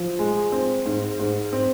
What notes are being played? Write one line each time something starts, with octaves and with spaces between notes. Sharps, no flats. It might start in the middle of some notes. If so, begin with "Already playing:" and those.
Already playing: F3
G#3
C4
G#2
G#2
C4